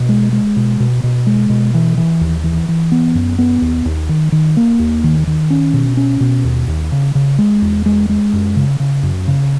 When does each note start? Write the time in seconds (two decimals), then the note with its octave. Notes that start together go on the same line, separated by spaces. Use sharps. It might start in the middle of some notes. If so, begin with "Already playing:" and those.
Already playing: B2
0.09 G#3
0.32 G#3
0.56 B2
0.80 B2
1.03 B2
1.27 G#3
1.50 B2
1.74 E3
1.97 E3
2.21 D#2
2.44 E3
2.68 E3
2.92 B3
3.15 F#2
3.39 B3
3.62 D#2
3.86 D#2
4.09 D#3
4.32 D#3
4.57 A#3
4.79 D#2
5.04 D#3
5.27 D#3
5.50 C#4
5.73 B2
5.97 C#4
6.21 B2
6.44 D#2
6.68 D#2
6.92 C#3
7.15 C#3
7.38 G#3
7.62 E2
7.86 G#3
8.09 G#3
8.33 F#2
8.56 C#3
8.80 C#3
9.03 F#2
9.28 C#3